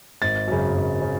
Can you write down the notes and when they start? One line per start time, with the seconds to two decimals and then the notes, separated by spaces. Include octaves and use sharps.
0.22 G#1 A6
0.48 F#2 C#3
0.74 G#1
1.02 C#3